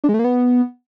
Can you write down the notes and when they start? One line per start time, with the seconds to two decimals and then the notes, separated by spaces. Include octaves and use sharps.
0.04 D4
0.09 G#3
0.14 A3
0.19 A#3
0.24 B3